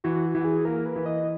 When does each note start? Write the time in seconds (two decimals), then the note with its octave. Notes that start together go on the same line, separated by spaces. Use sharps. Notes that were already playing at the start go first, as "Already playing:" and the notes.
0.04 E3 F#4
0.35 E3
0.40 F#4
0.44 G#4
0.65 A#3 A#4
0.85 B4
0.96 E3
1.06 D#5